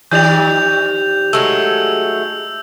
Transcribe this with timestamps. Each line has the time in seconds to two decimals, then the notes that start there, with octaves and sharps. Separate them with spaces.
0.11 D#3 G4 D5 G6 F7
1.33 F#3 G#3 A3 E6